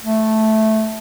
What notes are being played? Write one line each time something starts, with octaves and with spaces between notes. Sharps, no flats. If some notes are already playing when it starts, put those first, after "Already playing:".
A3